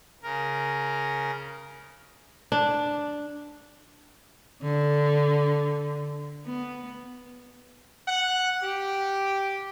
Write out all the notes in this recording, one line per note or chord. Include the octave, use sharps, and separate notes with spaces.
C#3 A#4
D4
D3
B3
F#5
G4